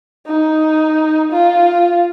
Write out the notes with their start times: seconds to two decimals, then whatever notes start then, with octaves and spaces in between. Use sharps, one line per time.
0.26 D#4
1.31 F4